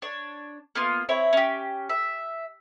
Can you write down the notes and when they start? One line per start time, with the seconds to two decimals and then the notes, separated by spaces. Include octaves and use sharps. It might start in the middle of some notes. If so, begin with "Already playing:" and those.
0.02 D4 C#5
0.75 A#3 B3 F4
1.09 C4 E4 C#5
1.33 C#4 G4
1.89 E5